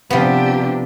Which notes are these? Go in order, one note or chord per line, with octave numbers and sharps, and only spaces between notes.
C3 F3 B3 D4 G4